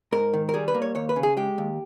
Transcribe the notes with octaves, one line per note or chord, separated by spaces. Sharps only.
G#2 A#4
D#3
A#4
G3 G#4
B4
A#3
C#5
D#2 C#5
B4
C#3
G#4
G#3 G4
D#2